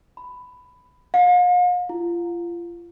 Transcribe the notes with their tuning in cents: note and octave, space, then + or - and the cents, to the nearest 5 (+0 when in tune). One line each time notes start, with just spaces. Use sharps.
B5 +10
F5 +45
F4 -30